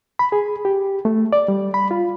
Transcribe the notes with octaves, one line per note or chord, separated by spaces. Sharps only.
B5
G#4
G4
A3
D5
G3
B5
F4